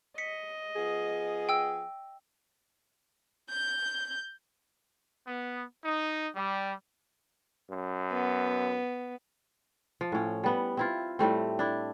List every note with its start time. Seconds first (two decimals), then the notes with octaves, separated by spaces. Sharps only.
0.18 D#5 B6 C#7
0.76 F3 B3 G#4
1.49 G5 E6
3.50 G6
5.27 B3
5.84 D#4
6.35 G3
7.70 F#2
8.12 B3
10.01 F3
10.12 A2 C#4
10.44 G3 B3 F#5
10.77 C4 E4 F4
11.19 A2 G3 A3 C4
11.59 D4 E4